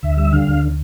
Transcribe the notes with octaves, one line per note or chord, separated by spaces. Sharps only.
D2 E5
G3 E5
D3 F5
D2